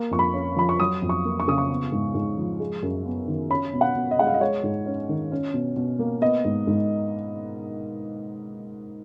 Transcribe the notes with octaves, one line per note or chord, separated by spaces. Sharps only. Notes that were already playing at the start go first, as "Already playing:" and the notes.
Already playing: A#3
F2 C#6
B5
C#4
F3 B5
C#6
F#3 D#6
F2
C#6
A#3
C#6
C#3 D#6
C#6
B3
G#2
G#2
F3
G#3
F#2
B3
D#3
C#4 B5
B2
F#5
B2
D#5
G#3 F#5
F5
D#5
G#3 C#5
G#2
C#4
D#3
C#4
B2
B2
A#3
B3 D#5
G#2
G#2